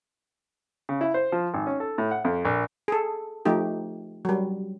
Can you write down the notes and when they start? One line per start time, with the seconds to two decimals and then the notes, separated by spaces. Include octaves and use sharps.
0.89 C#3
1.01 E4
1.14 C5
1.32 F3
1.54 G#1
1.67 C#4
1.80 A4
1.98 A2
2.11 F#5
2.25 F2
2.45 A#1
2.88 G#4 A4
3.45 F3 A3 D#4 G4
4.25 F#3 G3